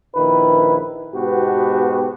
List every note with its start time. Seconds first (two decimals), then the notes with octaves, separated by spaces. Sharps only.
0.14 A#1 D#3 E4 B4
1.14 G#2 B2 B3 F#4 G4